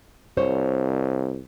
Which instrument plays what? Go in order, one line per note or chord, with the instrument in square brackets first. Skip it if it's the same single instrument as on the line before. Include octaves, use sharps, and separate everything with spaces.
[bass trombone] C2 [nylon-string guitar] C5 C#5